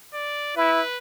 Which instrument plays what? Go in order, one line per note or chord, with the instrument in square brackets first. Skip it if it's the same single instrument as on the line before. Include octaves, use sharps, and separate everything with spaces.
[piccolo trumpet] D5
[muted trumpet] E4 [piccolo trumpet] B4